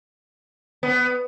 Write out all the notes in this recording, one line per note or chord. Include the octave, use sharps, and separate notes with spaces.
B3